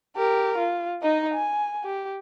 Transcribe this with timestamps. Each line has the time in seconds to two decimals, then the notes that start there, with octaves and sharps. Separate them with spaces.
0.17 G4 A#4
0.58 F4
1.02 D#4 D#5
1.34 G#5
1.84 G4